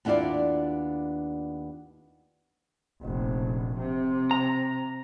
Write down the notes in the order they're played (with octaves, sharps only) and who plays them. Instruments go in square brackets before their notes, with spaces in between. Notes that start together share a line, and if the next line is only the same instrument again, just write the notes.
[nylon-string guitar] D#2 B3 D4 E4 F4 D5
[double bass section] F1 A#1
C3
[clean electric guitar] A#5